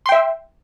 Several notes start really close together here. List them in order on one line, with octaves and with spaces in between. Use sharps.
C6 G5 E5